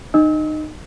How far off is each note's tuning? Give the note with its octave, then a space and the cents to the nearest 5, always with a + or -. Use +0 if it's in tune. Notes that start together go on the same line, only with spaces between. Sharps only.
D#4 -25 D#5 +0 E6 -35